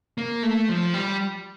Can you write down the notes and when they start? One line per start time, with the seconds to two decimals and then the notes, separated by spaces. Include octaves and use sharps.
0.18 A#3
0.43 A3
0.69 F3
0.94 G3